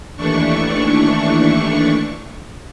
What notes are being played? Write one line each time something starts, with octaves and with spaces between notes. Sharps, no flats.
D#2 E3 A3 D4 C#6